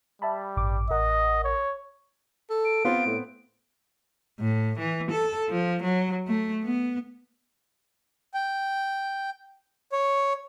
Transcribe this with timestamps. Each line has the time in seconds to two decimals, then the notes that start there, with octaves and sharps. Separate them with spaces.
0.22 G3 E5 A5 B5
0.57 A1 G2 D6
0.90 A1 A#4 D#5 F#5
1.44 C#5
2.50 A4
2.65 D7
2.85 B3 C4 F4
3.06 A2
4.40 A2
4.79 E3
5.11 A4
5.49 F3
5.83 F#3
6.28 A3
6.64 B3
8.34 G5
9.92 C#5